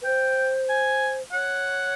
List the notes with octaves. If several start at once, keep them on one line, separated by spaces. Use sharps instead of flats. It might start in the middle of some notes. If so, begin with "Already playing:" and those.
B4
C5 G5
G#5
C#5 F#5